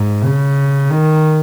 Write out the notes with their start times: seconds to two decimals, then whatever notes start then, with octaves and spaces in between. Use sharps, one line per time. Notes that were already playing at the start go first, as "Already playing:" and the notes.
Already playing: G#2
0.24 C#3
0.90 D#3